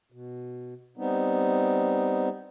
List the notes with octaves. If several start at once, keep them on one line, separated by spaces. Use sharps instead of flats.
B2
G3 B3 C4 D#4